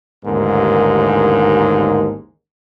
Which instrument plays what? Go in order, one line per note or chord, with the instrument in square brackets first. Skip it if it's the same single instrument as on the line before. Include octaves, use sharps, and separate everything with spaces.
[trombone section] A1 D#2 G#2 D3 A#3 A#4